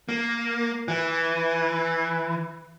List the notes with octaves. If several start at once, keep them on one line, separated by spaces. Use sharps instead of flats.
A#3
E3